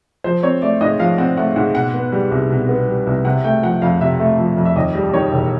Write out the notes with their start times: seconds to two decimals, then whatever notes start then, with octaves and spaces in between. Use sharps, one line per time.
0.24 F3 C5
0.43 C4 C#5
0.62 A3 D5
0.81 G#2 D#5
0.99 F3 F5
1.18 C4 F#5
1.37 A3 F#5
1.56 G#2 F#5
1.75 B2 F#5
1.94 B3
2.12 G3
2.31 C2
2.50 B2
2.69 B3
2.88 G3
3.07 C2
3.25 C3 F#5
3.44 A3 G5
3.63 F3 F#5
3.82 F2 F5
4.01 C3 E5
4.20 A3
4.38 F3
4.57 F2
4.65 E5
4.76 D#2 D#5
4.95 G3
5.14 D#3 C#5
5.32 E1